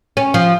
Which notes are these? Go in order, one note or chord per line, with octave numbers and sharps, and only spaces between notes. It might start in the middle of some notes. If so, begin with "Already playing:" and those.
C#4
F3